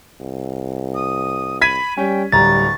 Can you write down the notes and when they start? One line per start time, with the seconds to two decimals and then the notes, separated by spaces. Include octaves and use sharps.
0.20 C2
0.95 D#6
1.62 B5 G#6 B6 D#7
1.97 G3 C#4 G5
2.32 D1 G3 A#5 C#6 A6